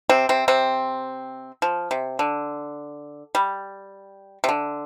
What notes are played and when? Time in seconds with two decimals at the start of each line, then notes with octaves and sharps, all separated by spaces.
0.09 C3 C4
0.29 C3 C4
0.48 C3 C4
1.62 F3
1.91 C3
2.19 D3
3.35 G3
4.44 C3
4.49 D3